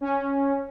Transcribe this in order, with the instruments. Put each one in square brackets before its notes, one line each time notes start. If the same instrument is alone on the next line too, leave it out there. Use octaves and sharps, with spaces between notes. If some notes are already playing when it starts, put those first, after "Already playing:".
[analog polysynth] C#4